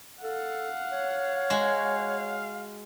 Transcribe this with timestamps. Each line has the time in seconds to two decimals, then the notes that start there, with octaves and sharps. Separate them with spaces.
0.22 A4 F5 F#5
0.92 C#5
1.50 G#3 F#4